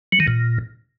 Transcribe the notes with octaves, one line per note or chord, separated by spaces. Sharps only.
F#3
D#3
A#2